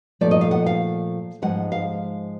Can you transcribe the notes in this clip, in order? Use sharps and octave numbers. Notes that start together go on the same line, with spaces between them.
A#2 F3 A3 D5
D#5
F5
F#5
F5
G#2 F3 G#3 F#5
F5